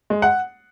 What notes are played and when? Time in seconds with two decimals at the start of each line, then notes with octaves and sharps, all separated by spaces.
0.10 G#3
0.22 F#5